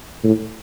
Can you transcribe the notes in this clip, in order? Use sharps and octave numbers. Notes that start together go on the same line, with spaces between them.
A2